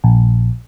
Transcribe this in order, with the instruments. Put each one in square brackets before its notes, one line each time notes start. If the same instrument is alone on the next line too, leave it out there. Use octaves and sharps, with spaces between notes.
[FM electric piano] A#1